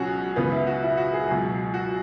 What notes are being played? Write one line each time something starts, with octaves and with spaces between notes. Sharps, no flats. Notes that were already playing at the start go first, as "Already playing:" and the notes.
Already playing: C#2 B2 F#3 C#4 F#4 G#4
C#2 C#3 E3 B3
E4
F#4
E4
F#4
G#4
C#2 B2 F#3 G#4
F#4